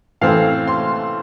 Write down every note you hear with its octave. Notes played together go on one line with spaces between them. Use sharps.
A2 E3 A3 C4 F5
C6